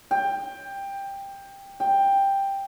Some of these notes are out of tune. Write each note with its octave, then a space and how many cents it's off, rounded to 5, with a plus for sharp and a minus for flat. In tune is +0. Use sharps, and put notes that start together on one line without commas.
G5 +15
G5 +10